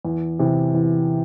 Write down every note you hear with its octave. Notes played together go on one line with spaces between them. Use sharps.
E2
C3 E3
E2